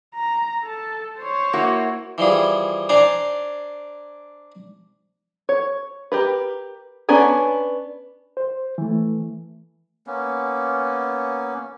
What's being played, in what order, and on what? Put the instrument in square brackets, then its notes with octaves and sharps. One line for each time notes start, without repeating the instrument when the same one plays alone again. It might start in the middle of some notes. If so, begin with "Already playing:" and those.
[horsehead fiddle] A#5
A4 A5
C5 C#5
[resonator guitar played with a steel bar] A#3 E4 F#4
[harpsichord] E3 F3 G3 G#4
D4 C5 D5 G#5 A#5
[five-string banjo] C#5
G4 A#4 B4
B3 C#4 D4 G#5 A#5
[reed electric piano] C5
E3 A3
[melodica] A#3 B3 C#4